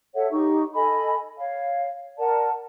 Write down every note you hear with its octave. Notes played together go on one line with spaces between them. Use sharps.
A4 C#5 E5 F#5
D#4 G4 C#6
A4 D#5 G#5 B5
C#5 F5
A#4 D5 F#5 A5